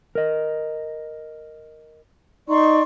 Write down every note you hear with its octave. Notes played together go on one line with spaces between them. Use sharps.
A#4 D#5
D#4 D5 C6 C#6